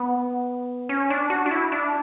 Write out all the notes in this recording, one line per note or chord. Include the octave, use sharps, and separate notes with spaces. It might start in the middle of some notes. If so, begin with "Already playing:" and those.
Already playing: B3
C#4
D4
F#4
D4
E4
D4